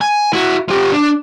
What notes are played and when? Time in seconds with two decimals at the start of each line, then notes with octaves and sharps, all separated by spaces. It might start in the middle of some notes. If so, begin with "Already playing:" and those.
0.01 G#5
0.33 E4 F#4
0.68 F3 G4
0.92 D4